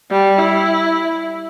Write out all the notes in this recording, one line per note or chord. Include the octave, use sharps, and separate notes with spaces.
G3
E4